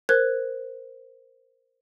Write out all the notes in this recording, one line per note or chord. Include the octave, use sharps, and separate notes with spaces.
A#4 C5 F#6 G#6